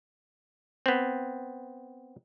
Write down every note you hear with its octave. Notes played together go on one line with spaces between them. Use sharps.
B3 C4